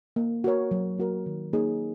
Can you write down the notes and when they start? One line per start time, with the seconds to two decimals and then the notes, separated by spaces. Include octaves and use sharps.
0.16 A#3
0.44 F#4 A#4 C#5
0.71 F#3
0.98 A#3 F#4 A#4
1.26 D#3
1.53 A#3 D#4 G#4 C#5